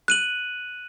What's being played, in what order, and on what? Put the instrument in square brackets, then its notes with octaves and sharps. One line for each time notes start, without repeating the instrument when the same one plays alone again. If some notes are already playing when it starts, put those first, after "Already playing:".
[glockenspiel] F#6 D#7 F#7